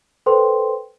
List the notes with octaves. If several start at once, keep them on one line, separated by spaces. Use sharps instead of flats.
A4 B4 C5 G5 C6